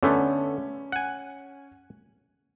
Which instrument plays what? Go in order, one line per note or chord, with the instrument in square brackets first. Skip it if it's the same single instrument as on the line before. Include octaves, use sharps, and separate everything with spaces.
[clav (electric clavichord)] D3 A3 B3 [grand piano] C#4
[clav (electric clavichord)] F#5 G#5